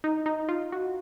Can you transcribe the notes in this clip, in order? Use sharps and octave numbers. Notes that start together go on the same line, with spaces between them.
D#4
D#4
F4
F#4